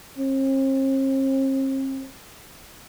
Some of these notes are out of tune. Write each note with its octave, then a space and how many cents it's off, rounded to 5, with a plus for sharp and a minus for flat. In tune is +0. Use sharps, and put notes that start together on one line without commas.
C4 +45